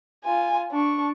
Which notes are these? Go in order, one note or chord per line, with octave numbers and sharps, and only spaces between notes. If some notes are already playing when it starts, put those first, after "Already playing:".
F4 G#5
D4 C#6